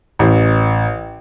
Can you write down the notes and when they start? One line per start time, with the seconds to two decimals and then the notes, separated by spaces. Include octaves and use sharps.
0.19 A1